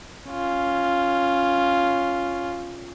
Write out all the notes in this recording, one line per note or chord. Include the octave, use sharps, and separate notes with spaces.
C#4 F4